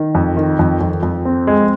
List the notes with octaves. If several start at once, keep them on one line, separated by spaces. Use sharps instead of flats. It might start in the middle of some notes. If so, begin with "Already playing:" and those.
Already playing: D#3
F2
D#3
F2
F2
F2
C4
G#3